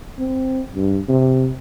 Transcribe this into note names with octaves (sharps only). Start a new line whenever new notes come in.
C4
G2
C3